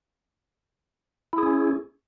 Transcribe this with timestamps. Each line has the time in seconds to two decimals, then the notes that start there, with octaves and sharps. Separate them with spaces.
1.33 E4
1.38 G#4
1.43 C#4